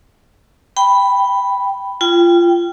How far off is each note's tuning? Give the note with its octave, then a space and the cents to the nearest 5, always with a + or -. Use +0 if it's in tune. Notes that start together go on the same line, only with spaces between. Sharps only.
G5 +0 B5 +0
F4 -20 G5 +0